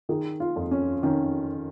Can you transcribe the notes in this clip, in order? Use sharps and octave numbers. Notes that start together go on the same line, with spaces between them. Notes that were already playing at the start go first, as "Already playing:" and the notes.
D#3 G#4
F4
F2
C#4
D#3 C#4